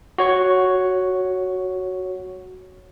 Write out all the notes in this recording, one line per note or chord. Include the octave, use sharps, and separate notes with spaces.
F#4 C#5 C#6